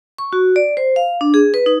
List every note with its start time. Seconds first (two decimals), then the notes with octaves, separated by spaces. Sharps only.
0.18 C#6
0.33 F#4
0.56 D5
0.77 C5
0.96 F5
1.21 D4
1.34 G#4
1.54 B4
1.66 D#4